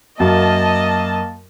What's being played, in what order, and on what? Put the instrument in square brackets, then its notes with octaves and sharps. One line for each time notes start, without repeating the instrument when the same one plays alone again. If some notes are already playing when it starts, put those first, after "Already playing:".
[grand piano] F#2 [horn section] A#3 A5 [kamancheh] D#5